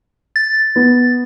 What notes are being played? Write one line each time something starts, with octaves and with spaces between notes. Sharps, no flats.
A6
B3